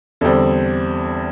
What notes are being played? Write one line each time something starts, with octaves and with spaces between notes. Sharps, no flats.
E2 D3 G3 C4 A4